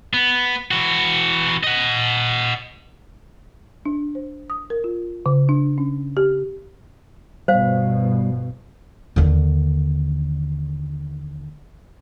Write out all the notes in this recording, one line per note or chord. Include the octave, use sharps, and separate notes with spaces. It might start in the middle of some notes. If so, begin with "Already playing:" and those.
B3
E3 F#4
D#5 F#5
D4
C5
D#6
A#4
F4
C#3
D4
C#4
G4
G1 B2 G3 C5 F5
D#2 D3